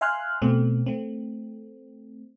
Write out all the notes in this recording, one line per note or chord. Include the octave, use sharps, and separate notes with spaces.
E5 F5 G#5 C6 F6 F#6
B2 A3 C4
A3 C4